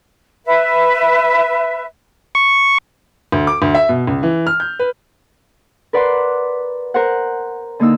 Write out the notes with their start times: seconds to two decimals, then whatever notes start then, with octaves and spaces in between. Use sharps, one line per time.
0.45 B4 E5
2.35 C#6
3.32 D2
3.47 D6
3.62 D2
3.75 E5
3.89 B2
4.07 C#2
4.23 E3
4.47 F6
4.60 G6
4.79 B4
5.93 A#4 B4 D5 F#5 B5 C6
6.94 A#4 C5 F#5
7.80 D3 A#3 D#4 E6